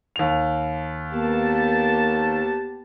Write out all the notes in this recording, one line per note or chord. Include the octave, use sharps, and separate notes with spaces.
D#2 F7
A#3 B3 G4 A5